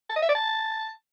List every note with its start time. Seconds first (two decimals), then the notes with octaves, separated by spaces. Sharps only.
0.10 A5
0.16 D#5
0.22 E5
0.29 D5
0.35 A5